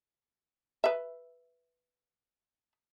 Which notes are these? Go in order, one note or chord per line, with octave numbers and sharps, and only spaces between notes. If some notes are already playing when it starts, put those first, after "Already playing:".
B4 E5